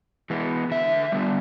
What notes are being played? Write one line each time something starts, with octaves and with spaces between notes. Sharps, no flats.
E3 G#3 B3
D3 E5
G3 B3 D4